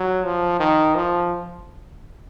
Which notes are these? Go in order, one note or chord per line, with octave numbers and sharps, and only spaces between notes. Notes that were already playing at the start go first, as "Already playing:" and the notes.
Already playing: F#3
F3
D#3
F3